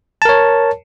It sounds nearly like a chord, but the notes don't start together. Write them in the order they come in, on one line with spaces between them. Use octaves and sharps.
A5 A#4 C#5